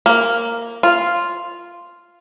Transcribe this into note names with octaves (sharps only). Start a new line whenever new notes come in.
A#3
F4